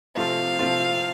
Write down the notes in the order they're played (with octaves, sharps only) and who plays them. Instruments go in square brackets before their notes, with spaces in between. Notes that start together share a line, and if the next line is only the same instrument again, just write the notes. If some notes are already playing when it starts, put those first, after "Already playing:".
[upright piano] C3 F3 A3 C4 F4 [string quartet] F5
[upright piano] C3 F3 A3 C4 F4